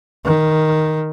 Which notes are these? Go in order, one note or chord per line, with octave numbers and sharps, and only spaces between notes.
D#3